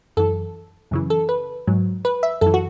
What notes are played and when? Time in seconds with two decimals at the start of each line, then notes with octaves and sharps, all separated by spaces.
0.17 F#2 E3 A4
0.91 F#2 C#3 E3
1.10 A4
1.29 B4
1.67 G#2 F#3
2.05 B4
2.23 E5
2.41 F#2 E3 A4
2.54 F#4